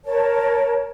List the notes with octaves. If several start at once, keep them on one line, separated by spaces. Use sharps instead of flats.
A#4 C#5 A5